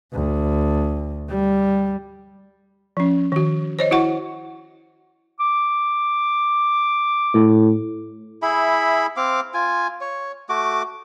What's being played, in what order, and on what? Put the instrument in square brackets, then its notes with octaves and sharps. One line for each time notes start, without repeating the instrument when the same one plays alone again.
[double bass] D2
G3
[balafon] F3 C#4
D#3 F#4
C5 C#5 D#5
E4 F#4 F#5 C#6
[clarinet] D6
[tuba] A2
[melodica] E4 G#4 E5 B5
C4 F5 D6
F4 G#5
C#5
A3 F#4 D6